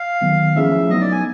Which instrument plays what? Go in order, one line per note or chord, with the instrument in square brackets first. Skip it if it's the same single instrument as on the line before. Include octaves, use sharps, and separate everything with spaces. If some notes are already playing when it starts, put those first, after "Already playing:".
Already playing: [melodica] F5
[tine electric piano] D#3 F#3 B3
[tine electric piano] F3 A3 C#4 E4 G#4 [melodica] E5
[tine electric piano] F#3 B3 D#4 [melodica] D#5
[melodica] D5
G#5